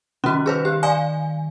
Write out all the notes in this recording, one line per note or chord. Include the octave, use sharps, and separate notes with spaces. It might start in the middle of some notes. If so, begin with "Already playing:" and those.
D#3 G3 C#4 F#4
G#4 B4 C5
G4
D5 F5 G#5